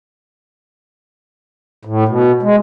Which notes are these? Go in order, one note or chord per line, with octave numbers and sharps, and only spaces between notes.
A2
B2
G#3